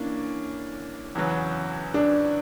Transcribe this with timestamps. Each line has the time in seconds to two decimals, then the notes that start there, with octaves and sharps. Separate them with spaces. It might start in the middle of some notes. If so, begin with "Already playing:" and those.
Already playing: E3 A#3 C#4 D4
1.15 E2 C#3 F#3
1.94 D4